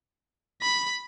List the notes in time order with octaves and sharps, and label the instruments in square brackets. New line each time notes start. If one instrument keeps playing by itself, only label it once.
[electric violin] B5